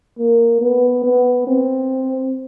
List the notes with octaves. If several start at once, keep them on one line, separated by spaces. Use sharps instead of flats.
A#3
B3
B3
C4